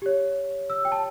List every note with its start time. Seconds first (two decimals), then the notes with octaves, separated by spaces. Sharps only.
0.02 G4 C#5
0.70 E6
0.85 G5
0.92 A5